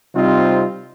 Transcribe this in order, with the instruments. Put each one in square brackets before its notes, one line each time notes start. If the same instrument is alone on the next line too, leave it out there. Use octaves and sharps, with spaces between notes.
[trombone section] C3 G3 C4 D#4 F4